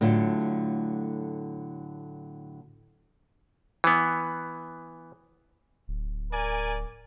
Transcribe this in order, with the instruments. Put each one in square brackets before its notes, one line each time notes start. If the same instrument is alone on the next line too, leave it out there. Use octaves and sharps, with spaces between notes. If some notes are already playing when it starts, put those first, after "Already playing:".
[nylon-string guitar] A2 D3 F#3 A3 F4
[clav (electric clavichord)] E3 B3
[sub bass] D1
[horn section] A#4 D5 G#5